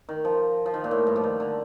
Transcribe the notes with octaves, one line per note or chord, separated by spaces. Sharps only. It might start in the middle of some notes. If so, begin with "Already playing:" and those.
D#3
F3
F3
D#3
A#2
A2
G2
F3
D#3
D3